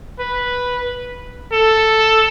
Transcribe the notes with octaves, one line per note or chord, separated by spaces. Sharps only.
B4
A4